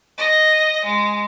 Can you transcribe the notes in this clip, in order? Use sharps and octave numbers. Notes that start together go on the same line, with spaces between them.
D#5
G#3